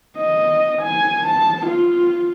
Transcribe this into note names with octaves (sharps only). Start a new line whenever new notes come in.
D#5
G#5
A5
F4